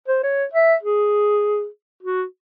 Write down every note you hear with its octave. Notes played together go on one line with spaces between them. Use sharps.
C5
C#5
E5
G#4
F#4